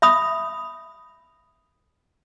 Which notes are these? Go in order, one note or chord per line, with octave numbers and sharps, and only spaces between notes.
E5 B5 D#6